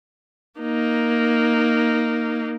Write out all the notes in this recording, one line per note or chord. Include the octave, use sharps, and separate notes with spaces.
A#3 D#4